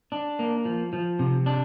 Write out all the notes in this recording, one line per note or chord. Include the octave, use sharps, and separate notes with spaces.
D4
A#3
F3
F3
C3
D4